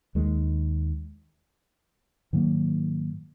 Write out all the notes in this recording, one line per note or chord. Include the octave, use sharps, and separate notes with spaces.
D#2 D#3 G#3
G#2 D#3 F#3 A#3